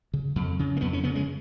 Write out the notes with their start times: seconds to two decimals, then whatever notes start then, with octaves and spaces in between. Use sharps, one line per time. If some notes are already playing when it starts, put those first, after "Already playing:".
0.14 C#3
0.36 F2
0.59 C#3
0.77 A#3
0.81 F2 B3
0.93 C#4
1.04 C#3 B3
1.15 G#3